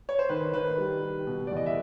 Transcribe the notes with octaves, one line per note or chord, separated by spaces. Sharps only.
C#5
C5
D#3 B4
D#3 B4
G3
G3
B2
E2 D5
D#5
E5